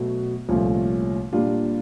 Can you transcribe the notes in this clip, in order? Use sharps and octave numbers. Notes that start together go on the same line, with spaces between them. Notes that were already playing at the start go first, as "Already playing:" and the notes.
Already playing: B2 F#3 A3
C2 A#2 F3 A3 C#4
A#2 G3 A#3 D4 F4